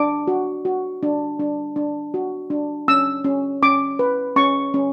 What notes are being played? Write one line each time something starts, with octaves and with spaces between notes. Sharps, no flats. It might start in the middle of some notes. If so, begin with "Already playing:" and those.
Already playing: D4 D6
F#4
F#4
D4
D4
D4
F#4
D4
C#4 E6
C#4
C#4 D6
B4
C#4 C#6
C#4